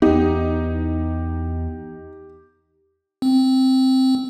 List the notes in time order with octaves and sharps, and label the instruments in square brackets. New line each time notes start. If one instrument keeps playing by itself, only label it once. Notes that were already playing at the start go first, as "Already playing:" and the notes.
[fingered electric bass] E2 B3 [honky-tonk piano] D#4 [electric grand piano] G4
[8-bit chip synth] C4